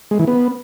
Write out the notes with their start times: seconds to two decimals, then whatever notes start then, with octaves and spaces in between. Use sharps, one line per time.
0.11 G#3
0.19 E3
0.27 B3